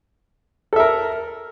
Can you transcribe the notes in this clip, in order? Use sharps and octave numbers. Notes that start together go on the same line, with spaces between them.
A4 A#4 E5